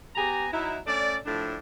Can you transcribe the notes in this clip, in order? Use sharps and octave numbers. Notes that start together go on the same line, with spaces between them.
B3 G4 G#5 A#5
F#3 D#4 E4
A3 C#4 D5
A2 F3 A3 D4